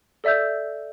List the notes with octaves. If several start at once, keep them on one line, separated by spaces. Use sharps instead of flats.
A4 D5 E5 E6 G6